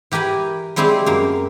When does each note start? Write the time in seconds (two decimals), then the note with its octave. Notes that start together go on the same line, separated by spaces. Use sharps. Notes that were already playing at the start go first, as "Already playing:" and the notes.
0.12 E3 G4 A#4 G#5 B5
0.76 G3 G#3 C4 E4 G4
1.06 F#2 A#3